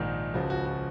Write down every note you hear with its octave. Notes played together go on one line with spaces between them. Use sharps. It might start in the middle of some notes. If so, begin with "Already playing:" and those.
Already playing: A#1 G#2 D#3
C#2 C#3 F3 F#4
F#4
F#4